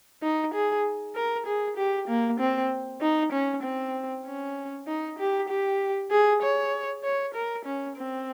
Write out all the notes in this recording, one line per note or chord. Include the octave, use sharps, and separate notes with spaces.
D#4
G#4
A#4
G#4
G4
A#3
C4
D#4
C#4
C4
C#4
D#4
G4
G4
G#4
C#5
C#5
A#4
C#4
C4